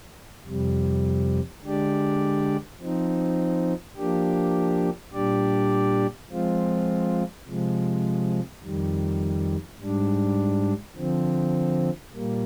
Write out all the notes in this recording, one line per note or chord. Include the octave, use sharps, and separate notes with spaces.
F2 C3 G3
D3 G#3 D4 G4 D5
F3 C4 D#4
F3 A#3 D4 G4
A#2 G3 D4 G4 D5
F3 G#3 C4 F4
C3 F3 G#3
F2 D#3 G3
G#2 G3 D4
D3 F3 C4
A#2 G3 A#3